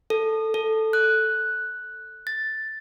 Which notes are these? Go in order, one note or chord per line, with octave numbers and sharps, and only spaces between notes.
A4
A4
F#6
A6